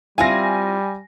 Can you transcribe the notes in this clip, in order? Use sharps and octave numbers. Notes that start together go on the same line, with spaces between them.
G3 C4 E4 F4 G#5 A#6